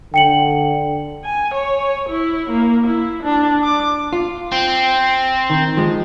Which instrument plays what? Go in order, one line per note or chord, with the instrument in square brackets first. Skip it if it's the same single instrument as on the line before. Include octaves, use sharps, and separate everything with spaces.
[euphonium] D3 [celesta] G5 C#7 F#7
[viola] G#5
C#5
E4
A#3
E4
D4
D6
[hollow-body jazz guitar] F4
[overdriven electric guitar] C4
[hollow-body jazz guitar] D#3
F3 G#3